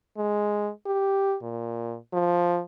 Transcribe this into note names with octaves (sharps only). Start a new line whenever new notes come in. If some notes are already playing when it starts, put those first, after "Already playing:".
G#3
G4
A#2
F3